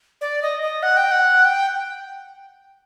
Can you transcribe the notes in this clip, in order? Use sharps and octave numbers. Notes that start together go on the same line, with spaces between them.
D5
D#5
D#5
F#5
G5
F#5
G5